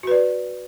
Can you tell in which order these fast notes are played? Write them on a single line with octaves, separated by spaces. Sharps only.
F#4 B4 D5